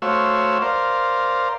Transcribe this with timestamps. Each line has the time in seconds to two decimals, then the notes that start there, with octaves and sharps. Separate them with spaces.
0.02 A3 F#4 C5 C#5 F5 E6
0.62 A#4 C5 D5 F5